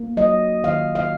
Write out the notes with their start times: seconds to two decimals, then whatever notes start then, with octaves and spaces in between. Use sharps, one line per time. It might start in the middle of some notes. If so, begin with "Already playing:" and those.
Already playing: A#3
0.17 F#3 D#5
0.64 D#3 F5
0.95 F5